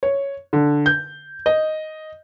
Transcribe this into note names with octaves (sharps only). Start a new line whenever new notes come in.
C#5
D3
G6
D#5